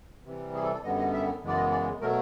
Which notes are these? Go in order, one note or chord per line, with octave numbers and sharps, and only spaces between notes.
C3 E3 G3
G#4
A4
A4
F#2 D3 G3 B3 D#5
D#5
E5
F#2 C#3 E3 G#3 B3 D5
D#5
D5
B2 F#3 A3 A#4